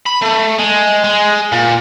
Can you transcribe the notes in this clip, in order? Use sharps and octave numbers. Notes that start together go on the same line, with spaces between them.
B5
A3
G#3
G#3
A#2